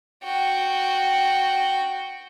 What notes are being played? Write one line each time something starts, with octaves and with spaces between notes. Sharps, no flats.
F#4 G5